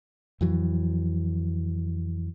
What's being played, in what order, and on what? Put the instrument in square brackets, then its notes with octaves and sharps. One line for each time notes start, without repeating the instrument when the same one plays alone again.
[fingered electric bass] F2 E3 F#3